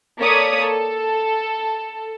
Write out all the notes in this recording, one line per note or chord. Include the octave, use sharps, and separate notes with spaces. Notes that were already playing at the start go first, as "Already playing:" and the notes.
A#3 A4 C#5 D5 D#6 B6
A4